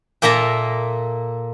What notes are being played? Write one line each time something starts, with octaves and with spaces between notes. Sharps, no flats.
A#2 A#3 A4 E5 A#5